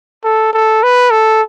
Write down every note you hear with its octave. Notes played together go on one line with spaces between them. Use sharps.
A4
A4
B4
A4